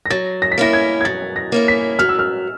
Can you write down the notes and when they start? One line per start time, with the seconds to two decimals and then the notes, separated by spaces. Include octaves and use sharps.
0.06 A#6
0.10 F#3 A6
0.42 A#6
0.52 B6
0.58 A#3 C#4 E4 A#6
0.73 G#6
1.01 G#6
1.05 F#3 A6
1.36 A#6
1.52 A#3 C#4 E4
1.68 B6
1.99 F#3 F6
2.09 E6
2.19 F6